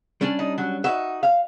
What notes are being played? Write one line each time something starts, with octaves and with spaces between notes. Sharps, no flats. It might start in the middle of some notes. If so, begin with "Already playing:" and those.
G3 C#4 D4
D#4
F#3
D#4 F#4 E5
F5